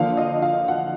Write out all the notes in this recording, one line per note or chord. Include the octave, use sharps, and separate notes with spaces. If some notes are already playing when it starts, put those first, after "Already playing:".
Already playing: D3 F3 A#3 F5
D#5
F5
F#5